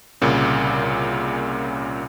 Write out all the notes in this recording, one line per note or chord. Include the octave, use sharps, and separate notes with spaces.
C2 A#2 C#3